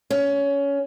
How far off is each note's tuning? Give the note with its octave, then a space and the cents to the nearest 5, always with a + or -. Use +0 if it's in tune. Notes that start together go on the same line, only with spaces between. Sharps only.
C#4 +20